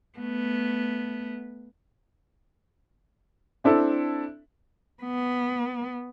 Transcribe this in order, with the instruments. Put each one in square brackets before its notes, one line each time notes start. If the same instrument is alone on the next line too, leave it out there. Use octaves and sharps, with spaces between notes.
[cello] A3 B3
[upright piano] C4 D4 E4 A4
[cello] B3